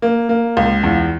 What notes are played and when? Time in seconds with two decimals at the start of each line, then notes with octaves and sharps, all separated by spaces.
0.02 A#3
0.29 A#3
0.57 C#2
0.83 E2